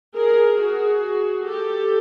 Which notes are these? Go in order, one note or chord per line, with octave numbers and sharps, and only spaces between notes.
G#4 A#4
F#4 G#4
G4 A4